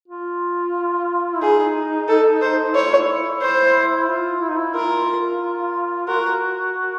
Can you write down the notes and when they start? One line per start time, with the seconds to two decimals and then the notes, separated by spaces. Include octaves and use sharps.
0.08 F4
1.34 E4
1.41 D#4 G#4
2.08 A4
2.42 C5
2.75 E4 C#5
2.86 F4
2.98 E4
3.42 C5
4.09 F4
4.41 E4
4.49 D#4
4.58 E4
4.75 F4 A#4
6.08 F#4 A#4